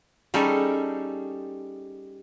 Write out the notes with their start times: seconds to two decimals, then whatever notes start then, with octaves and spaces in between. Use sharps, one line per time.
0.34 G3 C#4 D#4 G#4 A4